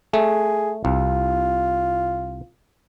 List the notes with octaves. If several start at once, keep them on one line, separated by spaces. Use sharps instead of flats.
A3 G#4
C2 F4